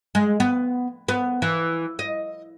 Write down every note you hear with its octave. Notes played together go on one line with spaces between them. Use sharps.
G#3
B3
B3
E3
D#5